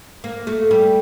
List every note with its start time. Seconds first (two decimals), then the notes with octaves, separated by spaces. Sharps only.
0.24 A#3
0.47 A3
0.71 G3